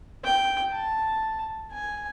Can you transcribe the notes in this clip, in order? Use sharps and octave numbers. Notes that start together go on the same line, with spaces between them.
G5
A5
G#5